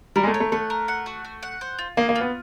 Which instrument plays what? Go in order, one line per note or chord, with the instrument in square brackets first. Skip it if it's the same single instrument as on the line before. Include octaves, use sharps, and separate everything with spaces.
[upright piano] G3 [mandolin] A#4
[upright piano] G#3
A3
[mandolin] C#5
[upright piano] A3
[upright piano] A3 [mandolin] F#5
[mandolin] A#4
F#5
F#4
F#4
F#5
C5
F4
[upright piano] A#3 [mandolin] G#4
[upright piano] A#3
[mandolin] F4
[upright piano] B3